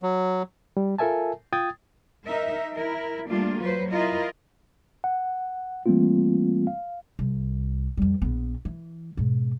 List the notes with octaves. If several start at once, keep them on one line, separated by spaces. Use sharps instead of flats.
F#3
G3
F4 A4 A#4 E5 G#5 A5
F4 G5 D#6 G#6 A6
D#4 A#4 E5
E4 A#4
G3 A3 A#3 D4 F4
F#3 B4 C5
E4 F4 A#4 D#5
F#5
E3 G3 A3 A#3 C4 F4
F5
C2
F2 G3
A#1 B3
E3
G#2 B2